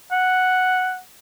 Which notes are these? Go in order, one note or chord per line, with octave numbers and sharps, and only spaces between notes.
F#5